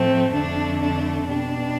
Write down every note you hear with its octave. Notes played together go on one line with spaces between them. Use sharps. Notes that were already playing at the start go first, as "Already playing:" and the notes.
Already playing: A2 F3 A3 C4
F2 D3 A3 D4
D4
B2 G3 D4